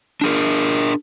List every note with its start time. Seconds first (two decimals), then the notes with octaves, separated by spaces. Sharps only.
0.21 D4 G#4 A#4